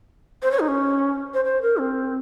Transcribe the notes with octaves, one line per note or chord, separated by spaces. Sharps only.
C5
C#5
D#4
C#4
C5
C5
A#4
C4